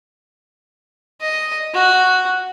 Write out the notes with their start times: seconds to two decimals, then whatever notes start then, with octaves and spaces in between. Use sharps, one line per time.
1.21 D#5
1.74 F#4